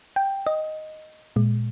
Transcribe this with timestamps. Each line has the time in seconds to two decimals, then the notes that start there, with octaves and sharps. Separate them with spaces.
0.16 G5
0.47 D#5
1.36 A#2 G#3